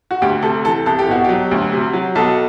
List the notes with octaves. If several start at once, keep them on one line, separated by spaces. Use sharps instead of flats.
F#4
D2 G4
C3 A4
E3 A4
C2 A4
G4
B2 F#4
F#3 G4
D2
C3
F#3
B1 A4